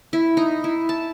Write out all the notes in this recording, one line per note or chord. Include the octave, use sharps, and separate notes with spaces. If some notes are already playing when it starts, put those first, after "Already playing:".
E4
D#4
E4
A5